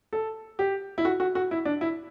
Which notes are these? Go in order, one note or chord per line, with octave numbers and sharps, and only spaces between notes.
A4
G4
E4
F#4
F#4
F#4
E4
D4
E4